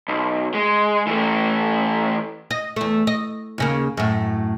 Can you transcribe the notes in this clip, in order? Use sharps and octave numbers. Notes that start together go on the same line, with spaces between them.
B1
G#3
E3 A3
D#5
E2 A3
D#5
D#2 C#3 A#3
F#2 A2